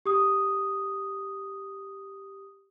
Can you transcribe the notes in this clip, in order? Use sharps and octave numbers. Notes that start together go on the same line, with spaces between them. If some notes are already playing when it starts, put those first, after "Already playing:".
G4 D#6